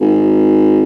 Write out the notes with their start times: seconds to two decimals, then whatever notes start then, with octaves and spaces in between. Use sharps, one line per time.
0.01 G#1